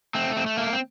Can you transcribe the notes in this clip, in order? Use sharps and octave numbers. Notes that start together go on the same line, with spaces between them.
A3 C4
C4
A3
A#3
C4